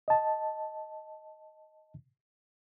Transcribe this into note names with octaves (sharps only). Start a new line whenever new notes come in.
D#5 A5